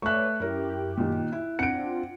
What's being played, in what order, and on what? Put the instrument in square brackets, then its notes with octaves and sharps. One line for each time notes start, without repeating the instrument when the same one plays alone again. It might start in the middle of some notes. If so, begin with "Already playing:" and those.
[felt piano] A3 E5 [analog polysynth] B4 C#5 D5 [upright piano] C#6 F#6
[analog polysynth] F#2 G4 [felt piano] E4 A#4
[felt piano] A#2 D#3
E4
[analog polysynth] C4 D4 F4 [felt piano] F#5 [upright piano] C#7 D7